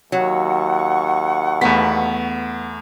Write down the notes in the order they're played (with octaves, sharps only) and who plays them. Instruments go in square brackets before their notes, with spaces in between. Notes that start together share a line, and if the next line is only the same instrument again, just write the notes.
[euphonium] D#2 [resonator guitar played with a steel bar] F#3 [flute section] F#5 C#6
[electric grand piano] E2 A3 B6 [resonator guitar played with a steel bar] B3